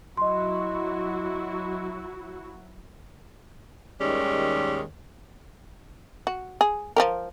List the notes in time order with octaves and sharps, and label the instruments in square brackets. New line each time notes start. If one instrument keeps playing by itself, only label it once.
[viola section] F#3 E4 F#4 [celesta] D#5 C6
[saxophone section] D#2 D#3 G3 G#3 C#4
[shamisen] F#4
G#4
F3 G4 A#4